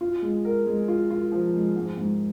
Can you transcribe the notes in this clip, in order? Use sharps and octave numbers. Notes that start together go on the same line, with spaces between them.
F4
G#3
A#4
G#3
F4
F4
F3
G#3
G#2
G#2